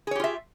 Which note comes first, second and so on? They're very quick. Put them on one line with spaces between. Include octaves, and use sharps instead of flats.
G#4 C#5 G4 F4 E5